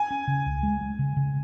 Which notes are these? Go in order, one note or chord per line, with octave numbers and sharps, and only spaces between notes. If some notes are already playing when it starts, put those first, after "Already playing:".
Already playing: G#5
C#4
C#3
C#2
G#3
G#3
C#3
C#3